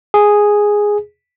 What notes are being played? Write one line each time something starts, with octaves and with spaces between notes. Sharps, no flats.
G#4